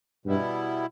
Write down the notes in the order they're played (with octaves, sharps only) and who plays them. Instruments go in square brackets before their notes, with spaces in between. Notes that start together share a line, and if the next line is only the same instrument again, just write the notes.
[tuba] G2 [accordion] B2 G3 B3 E4